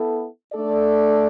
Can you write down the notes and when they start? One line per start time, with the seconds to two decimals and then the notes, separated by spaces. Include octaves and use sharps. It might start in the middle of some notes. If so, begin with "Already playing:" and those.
Already playing: B3 E4 A4
0.52 A3 D4 A4 D5